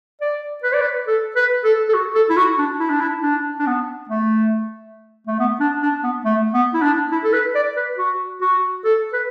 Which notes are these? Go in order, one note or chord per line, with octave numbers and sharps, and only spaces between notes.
D5
B4
D5
B4
A4
B4
A4
A4
F#4
A4
E4
F#4
D4
E4
D4
E4
D4
D4
B3
A3
A3
B3
D4
D4
B3
A3
B3
E4
D4
E4
A4
B4
D5
B4
F#4
F#4
A4
B4